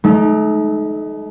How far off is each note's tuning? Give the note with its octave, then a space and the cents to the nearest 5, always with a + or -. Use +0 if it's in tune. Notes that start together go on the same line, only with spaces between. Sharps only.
A3 -40 D#4 -5